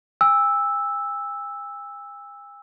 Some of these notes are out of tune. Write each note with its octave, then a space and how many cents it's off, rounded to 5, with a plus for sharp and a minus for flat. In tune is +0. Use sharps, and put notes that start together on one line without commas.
G#5 -45 E6 -5